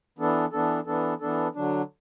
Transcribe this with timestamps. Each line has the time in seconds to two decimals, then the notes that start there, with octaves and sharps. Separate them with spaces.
0.19 E3 B3 D4 A4
0.52 E3 B3 D4 A4
0.87 E3 B3 D4 A4
1.21 E3 B3 D4 A4
1.55 D3 F#3 D4